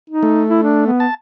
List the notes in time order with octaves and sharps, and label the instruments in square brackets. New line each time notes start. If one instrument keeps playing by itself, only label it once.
[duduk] D#4
[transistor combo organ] A3
[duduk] E4
D4
B3
[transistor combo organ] A5